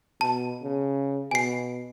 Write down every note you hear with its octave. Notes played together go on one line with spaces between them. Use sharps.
B2 A5
C#3
B2 G#5 C7